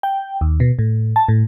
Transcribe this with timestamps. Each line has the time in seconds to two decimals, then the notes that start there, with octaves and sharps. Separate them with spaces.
0.03 G5
0.41 D#2
0.60 B2
0.79 A2
1.16 A5
1.29 A2